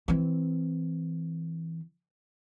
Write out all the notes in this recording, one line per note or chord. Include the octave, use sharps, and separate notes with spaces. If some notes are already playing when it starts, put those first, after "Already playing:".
E3 C4